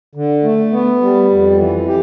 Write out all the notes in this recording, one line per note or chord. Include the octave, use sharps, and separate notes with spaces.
D3
A3
B3
G3
F2
E3
G4